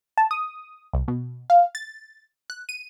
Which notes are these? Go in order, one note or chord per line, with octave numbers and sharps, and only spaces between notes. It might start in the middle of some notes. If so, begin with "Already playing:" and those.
A5
D#6
C2
B2
F5
A6
F#6
D#7